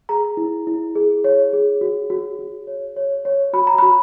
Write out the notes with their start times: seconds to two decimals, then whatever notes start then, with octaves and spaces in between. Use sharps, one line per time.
0.09 G#4 A#5
0.37 E4
0.67 E4
0.95 G#4
1.24 C#5
1.53 G#4
1.81 F#4
2.10 F#4
2.39 F#4
2.67 C#5
2.96 C#5
3.25 C#5
3.53 F#4 B5
3.67 A#5
3.78 F#4 B5